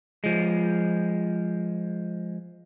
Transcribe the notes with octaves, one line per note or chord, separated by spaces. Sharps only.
F3 G#3